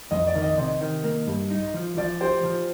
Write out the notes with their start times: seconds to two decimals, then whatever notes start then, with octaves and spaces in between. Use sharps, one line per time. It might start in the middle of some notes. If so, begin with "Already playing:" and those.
0.11 F2 D#5
0.27 D5
0.35 D#3
0.42 D#5
0.57 C3 D#5
0.81 D#3
1.04 A#3
1.27 G2
1.50 D#4
1.74 F3
1.97 F3 D5
2.21 G4 C5
2.43 F3